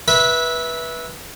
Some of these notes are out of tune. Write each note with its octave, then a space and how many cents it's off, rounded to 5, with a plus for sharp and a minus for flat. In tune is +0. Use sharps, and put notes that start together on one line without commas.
B4 -20 E5 -10